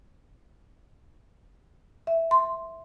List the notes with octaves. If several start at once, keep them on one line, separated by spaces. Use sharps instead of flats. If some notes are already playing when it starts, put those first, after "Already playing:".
E5
C6